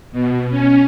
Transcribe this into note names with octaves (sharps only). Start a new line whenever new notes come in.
B2
C#4